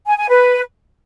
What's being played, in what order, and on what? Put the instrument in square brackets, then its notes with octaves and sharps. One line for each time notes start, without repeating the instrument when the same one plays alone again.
[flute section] G#5
G#5
B4